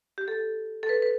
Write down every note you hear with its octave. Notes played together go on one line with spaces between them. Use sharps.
G4
A4
A4
B4
B4